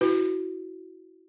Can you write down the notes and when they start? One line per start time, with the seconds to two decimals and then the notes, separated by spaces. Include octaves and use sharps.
0.01 E4 F#4 B4